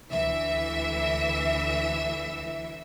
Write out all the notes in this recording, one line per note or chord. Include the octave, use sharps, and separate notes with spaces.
D2 E3 E5